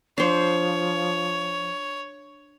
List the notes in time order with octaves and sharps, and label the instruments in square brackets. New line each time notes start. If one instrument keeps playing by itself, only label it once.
[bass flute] F3 [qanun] D4 C5 [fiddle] C#5